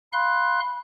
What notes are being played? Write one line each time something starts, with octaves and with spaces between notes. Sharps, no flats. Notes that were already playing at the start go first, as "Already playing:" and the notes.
F5 B5 C6 F#6